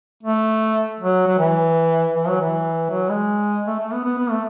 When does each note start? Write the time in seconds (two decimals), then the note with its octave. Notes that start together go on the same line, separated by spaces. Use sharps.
0.23 A3
1.00 F#3
1.27 F#3
1.38 E3
2.15 E3
2.28 F#3
2.41 E3
2.90 F#3
3.09 G#3
3.67 A3
3.80 A3
3.93 B3
4.04 B3
4.18 B3
4.30 A3